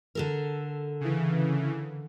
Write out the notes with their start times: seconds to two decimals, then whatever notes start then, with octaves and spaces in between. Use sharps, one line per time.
0.15 D3 A4 A#4
1.00 C#3 E3